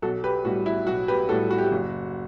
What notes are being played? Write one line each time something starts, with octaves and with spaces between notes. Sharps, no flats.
B1 F#4 A4
G4 B4
A2 G3 F#4
E4
B1 F#4
G4 B4
A2 G3 F#4 A4
F#4
G4
F#4
F#1